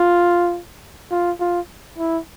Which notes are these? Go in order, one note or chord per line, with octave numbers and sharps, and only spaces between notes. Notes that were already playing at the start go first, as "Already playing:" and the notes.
Already playing: F4
F4
F4
E4